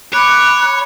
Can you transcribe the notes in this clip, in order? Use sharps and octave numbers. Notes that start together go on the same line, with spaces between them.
C#5 B5 D6 F#6